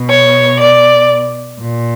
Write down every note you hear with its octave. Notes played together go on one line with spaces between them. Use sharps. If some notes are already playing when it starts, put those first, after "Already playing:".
Already playing: B2
C#5
D5
A#2